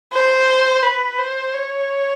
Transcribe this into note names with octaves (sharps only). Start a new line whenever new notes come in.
C5
B4
C5
C#5